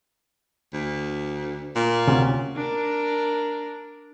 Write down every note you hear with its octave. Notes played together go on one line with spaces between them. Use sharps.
D2
A#2
D2 C3 C#4
D4 A#4